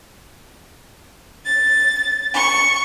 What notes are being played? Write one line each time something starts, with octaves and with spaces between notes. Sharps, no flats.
A6
C#6